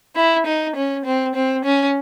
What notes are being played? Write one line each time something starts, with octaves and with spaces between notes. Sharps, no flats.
E4
D#4
C#4
C4
C4
C#4